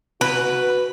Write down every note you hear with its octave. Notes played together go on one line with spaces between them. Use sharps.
F#4 B4